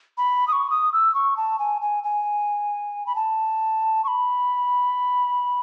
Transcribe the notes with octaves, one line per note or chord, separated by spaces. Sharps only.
B5
D#6
C#6
D#6
E6
C#6
A5
G#5
G#5
G#5
B5
A5
C#6
B5